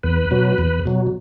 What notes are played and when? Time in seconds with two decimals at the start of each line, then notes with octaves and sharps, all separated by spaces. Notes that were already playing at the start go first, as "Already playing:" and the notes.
0.03 E2 B4
0.31 B2 F#3
0.58 E2
0.85 B2 F#3